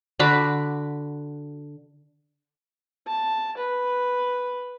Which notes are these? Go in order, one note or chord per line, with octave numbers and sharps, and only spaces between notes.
D3 F#4 B5 D6
A5
B4